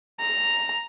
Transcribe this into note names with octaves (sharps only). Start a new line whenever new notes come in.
A#5